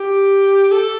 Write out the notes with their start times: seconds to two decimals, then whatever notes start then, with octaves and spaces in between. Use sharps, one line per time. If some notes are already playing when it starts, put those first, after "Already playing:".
Already playing: G4
0.71 A4